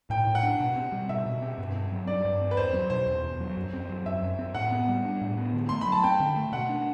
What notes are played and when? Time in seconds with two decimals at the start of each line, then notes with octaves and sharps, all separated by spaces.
0.10 A2 G5
0.27 A2
0.35 F#5
0.43 D4
0.60 B2
0.76 C4
0.92 G3
1.09 B2 E5
1.26 B2
1.42 C4
1.58 G2
1.75 C4
1.92 F#3
2.07 G2 D5
2.25 G2
2.41 C4
2.51 B4
2.57 E2 C5
2.73 F#3
2.90 B2 C5
3.06 E2
3.24 E2
3.40 F#3
3.57 F#2
3.73 C4
3.89 F#3
4.06 F#2 E5
4.23 F#2
4.39 C4
4.54 A2 F#5
4.72 B3
4.88 G3
5.05 D4
5.21 A2
5.37 B3
5.53 D3
5.69 A3 C6
5.81 B5
5.87 F#3
5.92 A5
6.04 C4 G5
6.20 D3
6.36 A3
6.52 B2 F#5
6.69 D4